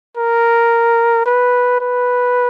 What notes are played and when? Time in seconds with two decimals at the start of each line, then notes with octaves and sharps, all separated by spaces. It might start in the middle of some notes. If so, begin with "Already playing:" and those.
0.17 A#4
1.26 B4
1.81 B4